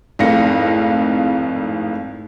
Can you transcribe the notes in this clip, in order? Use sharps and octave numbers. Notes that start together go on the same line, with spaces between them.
G#1 F2 A2 F5 A#6 C#7